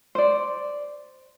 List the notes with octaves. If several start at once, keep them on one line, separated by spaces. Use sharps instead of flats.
C5 D5